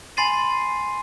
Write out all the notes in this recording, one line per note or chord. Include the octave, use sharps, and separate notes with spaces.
G#5 B5 C6 A6 C7 D#7